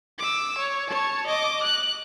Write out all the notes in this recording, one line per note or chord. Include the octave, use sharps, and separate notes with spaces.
D6 E6
C#5
C#5 A5
D#5 D6
F#6